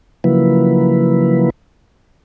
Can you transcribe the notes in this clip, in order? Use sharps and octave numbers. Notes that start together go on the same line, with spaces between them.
C#3 F3 F#3 A#3 E4 B4